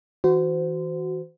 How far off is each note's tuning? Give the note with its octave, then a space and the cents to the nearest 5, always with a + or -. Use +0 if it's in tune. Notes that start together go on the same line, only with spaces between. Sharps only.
E3 -35 F#4 +0 C5 -30